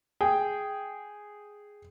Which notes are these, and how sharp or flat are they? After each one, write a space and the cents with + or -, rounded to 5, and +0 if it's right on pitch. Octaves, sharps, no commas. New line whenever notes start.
G#4 +0 G5 +0